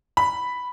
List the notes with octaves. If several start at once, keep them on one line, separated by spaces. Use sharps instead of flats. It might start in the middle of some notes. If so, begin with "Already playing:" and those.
B5